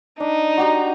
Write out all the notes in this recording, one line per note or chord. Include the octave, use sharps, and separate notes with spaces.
D4 D#4
F#4 G4 A#5